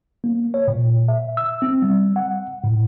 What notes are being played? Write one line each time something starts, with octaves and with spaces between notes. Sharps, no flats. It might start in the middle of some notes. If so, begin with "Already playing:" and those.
A#3
C#5
A#2
E5
E6
C4
G3
F#5
A2